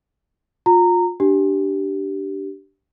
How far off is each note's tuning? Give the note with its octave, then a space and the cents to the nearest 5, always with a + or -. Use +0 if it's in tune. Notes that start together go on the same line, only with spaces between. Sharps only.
F4 +25 A#5 -15
D4 +0 G4 -20